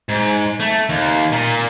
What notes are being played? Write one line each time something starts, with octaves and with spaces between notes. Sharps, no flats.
G#2
A3
D#2
A#2